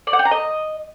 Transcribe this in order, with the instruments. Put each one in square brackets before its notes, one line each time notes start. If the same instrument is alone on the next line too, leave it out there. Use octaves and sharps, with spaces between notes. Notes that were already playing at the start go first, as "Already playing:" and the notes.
[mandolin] D5
F#5
G5
A#5
D#5